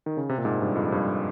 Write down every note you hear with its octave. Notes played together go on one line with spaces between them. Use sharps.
D#3
C#3
C3
A#2
G#2
G2
F2
G2